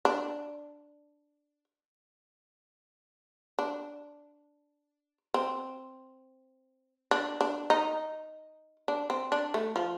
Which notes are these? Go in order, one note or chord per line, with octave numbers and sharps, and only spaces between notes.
D4
D4
C4
D4
D4
D#4
D4
C4
D4
A3
F3